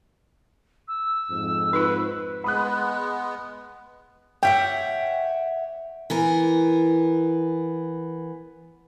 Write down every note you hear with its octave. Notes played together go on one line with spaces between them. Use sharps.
E6
F2 G#2
D#4 F4 B4
G#3 B3 B5 D#6 F#6
C#5 E5 F#5 G5
E3 B3 A#4